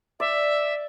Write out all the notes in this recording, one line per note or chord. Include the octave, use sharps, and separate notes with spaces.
D5 E5